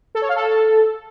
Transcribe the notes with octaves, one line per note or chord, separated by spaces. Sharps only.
A4
C#5
F5
A4